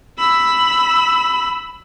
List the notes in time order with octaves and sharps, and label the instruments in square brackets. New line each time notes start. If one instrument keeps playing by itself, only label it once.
[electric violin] B5 E6